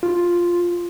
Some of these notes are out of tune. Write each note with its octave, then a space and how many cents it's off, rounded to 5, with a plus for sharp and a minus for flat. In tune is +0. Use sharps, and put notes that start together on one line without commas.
F4 +0